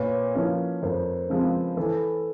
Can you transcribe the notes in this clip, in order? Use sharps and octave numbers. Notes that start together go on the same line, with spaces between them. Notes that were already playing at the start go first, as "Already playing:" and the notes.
Already playing: A#2 B4 C#5
F3 A#3 C#4 E4
F2 A#4 C5
C#3 F3 G#3 C4
E3 A4 B4